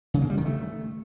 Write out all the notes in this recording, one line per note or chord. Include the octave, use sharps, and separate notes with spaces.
C#3
A#3
G3
D#3
A3